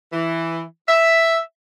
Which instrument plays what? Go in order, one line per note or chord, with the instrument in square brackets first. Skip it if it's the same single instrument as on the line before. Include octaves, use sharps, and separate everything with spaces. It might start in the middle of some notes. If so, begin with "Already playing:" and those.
[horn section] E3
E5